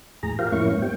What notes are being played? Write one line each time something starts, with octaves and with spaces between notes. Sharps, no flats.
E2 A2 G#4 A#5
F4 G4 A#4 C5 F5
F2 A2 A#3 C#4 E4 C#6
G#2 B3
G3 C4 G5